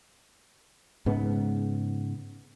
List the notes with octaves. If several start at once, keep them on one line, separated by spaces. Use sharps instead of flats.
G#2 C#3 B3